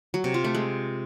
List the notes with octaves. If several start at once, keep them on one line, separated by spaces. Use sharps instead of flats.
F#3
C3
F4
A3
G#3